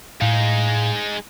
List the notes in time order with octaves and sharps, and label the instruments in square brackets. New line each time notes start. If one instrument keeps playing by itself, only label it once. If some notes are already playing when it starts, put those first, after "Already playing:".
[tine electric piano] A2 F5 [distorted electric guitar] G#3 D#4